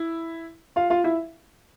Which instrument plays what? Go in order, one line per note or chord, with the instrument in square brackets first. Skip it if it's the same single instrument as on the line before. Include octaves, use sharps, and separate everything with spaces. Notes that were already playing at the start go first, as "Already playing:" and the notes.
Already playing: [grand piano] E4
F4 F5
F4 F5
E4 E5